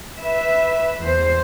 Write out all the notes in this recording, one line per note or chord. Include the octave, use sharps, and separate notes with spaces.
B4 E5
E2 C5